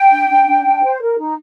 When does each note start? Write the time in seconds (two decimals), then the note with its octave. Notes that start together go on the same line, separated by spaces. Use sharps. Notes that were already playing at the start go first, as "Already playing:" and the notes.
Already playing: G5
0.10 D4
0.29 D4
0.46 D4
0.64 D4
0.82 C5
1.00 A#4
1.18 D#4